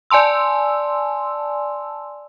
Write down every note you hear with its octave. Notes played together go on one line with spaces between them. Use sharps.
D5 G#5 A5 C6 E6